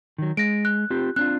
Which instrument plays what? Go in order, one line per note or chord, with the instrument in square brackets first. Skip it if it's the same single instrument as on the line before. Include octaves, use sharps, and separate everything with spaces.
[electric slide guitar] D#3 F#3
[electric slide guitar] G#3 [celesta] A#6 D7
[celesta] F#6
[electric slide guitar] C4 F4 G4
[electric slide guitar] C4 D4 F4 [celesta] F#6